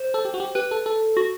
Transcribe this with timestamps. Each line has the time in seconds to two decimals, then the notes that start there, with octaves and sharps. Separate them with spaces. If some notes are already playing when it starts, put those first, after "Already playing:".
Already playing: C5
0.14 A4
0.25 G4
0.34 F#4
0.40 G4
0.55 G4 B4
0.71 A4
0.86 A4
1.17 F#4